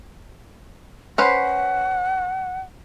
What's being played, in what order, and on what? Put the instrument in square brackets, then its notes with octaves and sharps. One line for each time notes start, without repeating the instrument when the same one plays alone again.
[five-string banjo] C#4 B4 C5 [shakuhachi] F#5